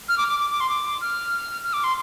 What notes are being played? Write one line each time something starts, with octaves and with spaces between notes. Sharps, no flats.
F6
D6
D6
D6
D6
C6
D6
F6
F6
D6
C6